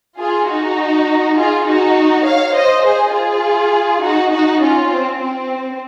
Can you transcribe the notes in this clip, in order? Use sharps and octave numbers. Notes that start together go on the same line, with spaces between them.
F4 G#4
D#4 F#4
F4 G#4
D#4 F#4
C#5 F5
C5 D#5
G#4 C5
F4 G#4
D#4 F#4
D#4 F#4
C#4 F4
C4
C4